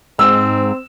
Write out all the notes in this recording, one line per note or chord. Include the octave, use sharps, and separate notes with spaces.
G#2 C4 E6